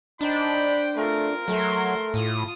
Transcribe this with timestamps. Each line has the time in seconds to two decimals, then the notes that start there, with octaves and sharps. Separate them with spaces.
0.21 D4 D#4 C5 G5 B5
0.96 A3 C4 F4 A#4
1.48 F#3 A3 E5 C6
2.14 A2 F4 D#6